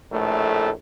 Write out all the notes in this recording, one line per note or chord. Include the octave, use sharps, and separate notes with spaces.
A#1 A2 A3